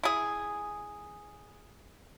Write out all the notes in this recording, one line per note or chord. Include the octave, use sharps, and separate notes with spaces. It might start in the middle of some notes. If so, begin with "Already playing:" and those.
E4 G#4